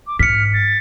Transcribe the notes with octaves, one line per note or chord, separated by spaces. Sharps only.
D6
G#2 F6 B6 C#7
A6